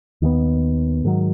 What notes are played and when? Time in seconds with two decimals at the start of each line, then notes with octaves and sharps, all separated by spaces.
0.22 D#2 D#3 G#3 B3
1.04 G#2 D#3 F#3